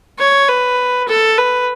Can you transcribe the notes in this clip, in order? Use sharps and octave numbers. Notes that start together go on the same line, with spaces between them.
C#5
B4
A4
B4